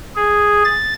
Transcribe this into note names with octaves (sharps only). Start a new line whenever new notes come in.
G#4
A6